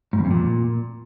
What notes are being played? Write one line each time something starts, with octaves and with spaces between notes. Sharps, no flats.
G#2
E2
F2
A#2